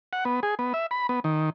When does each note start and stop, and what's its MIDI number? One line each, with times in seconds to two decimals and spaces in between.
0.13 0.24 78
0.25 0.40 59
0.43 0.55 68
0.59 0.73 59
0.74 0.86 76
0.91 1.07 83
1.09 1.20 59
1.24 1.50 51